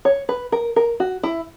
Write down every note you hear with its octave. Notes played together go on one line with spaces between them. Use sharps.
C#5
B4
A#4
A#4
F#4
E4